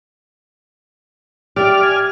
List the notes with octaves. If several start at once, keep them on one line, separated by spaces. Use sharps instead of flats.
G4 D5 E5 F6
G#5 F6